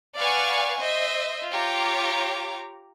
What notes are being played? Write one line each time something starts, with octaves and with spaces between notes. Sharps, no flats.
B4 D5 F5 F#5 G#5 C#6
C5 D#5 E5
F4 G4 C#5 A#5 D6